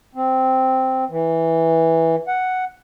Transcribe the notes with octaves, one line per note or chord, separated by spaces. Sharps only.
C4
E3
F#5